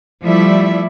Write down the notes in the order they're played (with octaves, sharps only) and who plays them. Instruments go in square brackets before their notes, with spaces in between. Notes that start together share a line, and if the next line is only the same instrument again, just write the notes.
[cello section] F3 G3 A3 E4 D5 E5